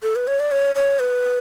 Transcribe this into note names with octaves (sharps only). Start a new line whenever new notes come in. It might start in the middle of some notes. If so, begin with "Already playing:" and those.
A4
B4
C#5
D5
C#5
C#5
B4